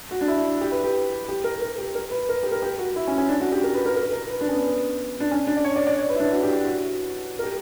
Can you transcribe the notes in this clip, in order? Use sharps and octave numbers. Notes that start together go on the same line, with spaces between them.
F#4
D4
E4
G4
B4
G4
G4
A#4
A#4
G4
A#4
B4
A#4
G4
A#4
G4
F#4
E4
C#4
C#4
D4
F#4
G4
A#4
B4
A#4
A#4
A#4
B4
D4
C#4
B3
D4
C#4
D4
D5
C#5
D5
D5
C#5
B4
E4
D4
F#4
G4
F#4
F#4
A#4
G4